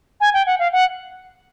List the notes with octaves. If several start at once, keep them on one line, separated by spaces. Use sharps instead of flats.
G#5
G5
F#5
F5
F#5